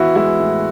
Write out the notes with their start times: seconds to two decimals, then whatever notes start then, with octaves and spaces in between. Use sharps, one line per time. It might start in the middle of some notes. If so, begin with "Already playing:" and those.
Already playing: E3 B3 E4 F#4
0.15 G#3 E4
0.40 A2